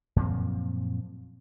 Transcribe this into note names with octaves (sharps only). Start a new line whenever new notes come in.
F#2 A#2 F3 C4